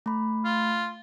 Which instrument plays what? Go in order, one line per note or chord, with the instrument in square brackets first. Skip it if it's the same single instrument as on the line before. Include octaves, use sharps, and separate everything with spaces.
[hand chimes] A3 B5
[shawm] F4